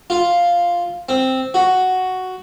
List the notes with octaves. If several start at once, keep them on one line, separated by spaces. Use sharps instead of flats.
F4
C4
F#4